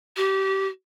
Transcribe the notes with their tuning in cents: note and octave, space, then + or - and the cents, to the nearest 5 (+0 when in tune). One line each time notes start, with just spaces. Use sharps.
G4 -25